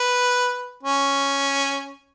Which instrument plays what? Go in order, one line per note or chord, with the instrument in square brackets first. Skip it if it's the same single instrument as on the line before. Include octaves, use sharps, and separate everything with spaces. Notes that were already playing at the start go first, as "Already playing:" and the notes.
Already playing: [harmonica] B4
C#4